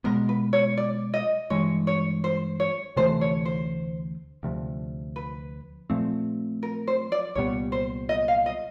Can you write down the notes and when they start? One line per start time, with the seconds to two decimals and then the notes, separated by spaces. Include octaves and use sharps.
0.04 B2 G#3 B3 A#4
0.29 B4
0.53 C#5
0.77 D5
1.14 D#5
1.50 G2 E3 G#3 C#5
1.87 C#5
2.24 C5
2.60 C#5
2.96 D2 C3 E3 A3 C5
3.21 C#5
3.45 C5
4.43 D2 C3 F3
5.16 B4
5.90 A#2 F3 A3 C4
6.63 A#4
6.87 C5
7.12 D5
7.35 C2 A#2 G3 B3 C#5
7.72 C5
8.09 D#5
8.28 F5
8.46 D#5